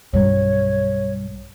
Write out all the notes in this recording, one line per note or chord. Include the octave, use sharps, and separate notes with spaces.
B1 G2 F#3 G3 C#5